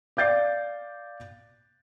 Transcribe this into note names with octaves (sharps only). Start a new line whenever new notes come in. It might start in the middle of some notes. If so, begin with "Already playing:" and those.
D5 F5 G6 A6 C7